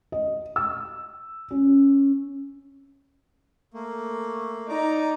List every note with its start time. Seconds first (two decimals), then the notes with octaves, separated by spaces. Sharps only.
0.12 D#5
0.56 E6
1.51 C#4
3.74 A3 A#3
4.69 D#4 D5 A#5 D6